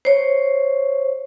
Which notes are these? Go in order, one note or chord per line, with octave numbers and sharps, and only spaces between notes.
C5 C#5